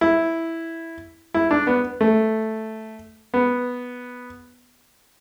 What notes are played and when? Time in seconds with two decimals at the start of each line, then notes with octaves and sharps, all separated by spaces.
0.01 E4
1.34 E4
1.51 D4
1.67 B3
2.01 A3
3.34 B3